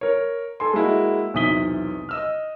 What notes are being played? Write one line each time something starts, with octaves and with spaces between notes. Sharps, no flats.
A#4 C#5
A4 G#5 C6
G#3 A#3 E4 F#4
B1 E2 C3 D#6 B6 G7
D#5 E6 F6